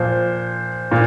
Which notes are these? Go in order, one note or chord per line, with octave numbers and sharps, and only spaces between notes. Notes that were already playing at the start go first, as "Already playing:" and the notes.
Already playing: A#2 F3 C5
A#2